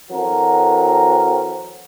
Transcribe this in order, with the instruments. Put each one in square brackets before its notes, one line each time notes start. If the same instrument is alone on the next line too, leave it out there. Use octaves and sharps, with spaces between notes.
[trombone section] E3 F#3 C4 F#4 A4 A#4